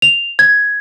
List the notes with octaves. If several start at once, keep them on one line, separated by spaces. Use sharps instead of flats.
F7
G#6